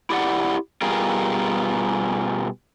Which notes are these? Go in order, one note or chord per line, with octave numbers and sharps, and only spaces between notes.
E4 G4 D5 F#5
B2 G3 F4 G#4 A#4